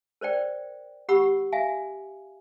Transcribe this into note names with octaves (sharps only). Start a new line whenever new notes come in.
A#4 C5 D5 G5
G4 F#5 B5 C#6 E6
E5 F5 G#5